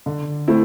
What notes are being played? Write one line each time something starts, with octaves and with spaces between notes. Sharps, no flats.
D3
A3 C4 E4